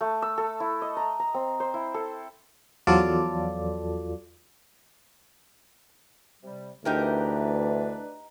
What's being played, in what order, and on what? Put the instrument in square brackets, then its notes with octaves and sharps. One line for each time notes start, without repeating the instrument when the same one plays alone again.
[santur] A3
E6
A4
E4
D#5
A#5
A#5
C4
C5
E4
A4
[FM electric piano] E2 F3 F#3 F4 A4 D5
[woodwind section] C3 G3
[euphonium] D2 [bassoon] E3 [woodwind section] D4 B4 [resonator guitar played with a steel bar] D#4 G4 A#4